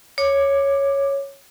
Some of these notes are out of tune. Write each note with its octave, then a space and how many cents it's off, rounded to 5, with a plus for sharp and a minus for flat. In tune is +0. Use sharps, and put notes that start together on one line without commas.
C#5 +0 D6 +15